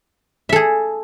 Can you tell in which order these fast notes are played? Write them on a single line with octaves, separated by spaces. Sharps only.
E5 A4 G#4